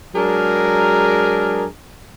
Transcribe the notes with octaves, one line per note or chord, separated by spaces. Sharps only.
F#3 G#3 D4 G#4 A#4